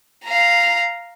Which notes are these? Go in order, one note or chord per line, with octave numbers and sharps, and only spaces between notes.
F5 A#5